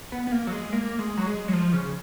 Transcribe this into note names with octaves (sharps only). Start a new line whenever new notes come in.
B3
B3
A#3
F#3
G#3
A#3
G#3
F#3
G#3
F#3
F3
C#3